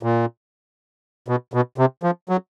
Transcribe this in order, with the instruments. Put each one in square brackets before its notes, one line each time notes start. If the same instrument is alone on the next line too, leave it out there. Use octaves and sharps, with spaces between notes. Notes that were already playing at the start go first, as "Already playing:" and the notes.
[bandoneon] A#2
B2
B2
C3
F3
F#3